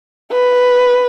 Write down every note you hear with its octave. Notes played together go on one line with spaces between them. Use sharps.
B4